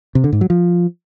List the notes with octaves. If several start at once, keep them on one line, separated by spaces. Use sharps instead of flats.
C3
D3
G#2
F#3
F3